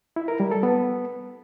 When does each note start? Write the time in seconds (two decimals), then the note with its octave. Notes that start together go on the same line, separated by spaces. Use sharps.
0.16 E4
0.28 A#4
0.40 G3
0.51 A4
0.63 B3